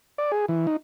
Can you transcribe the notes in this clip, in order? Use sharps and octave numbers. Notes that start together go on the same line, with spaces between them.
D5
G#4
E3
D#4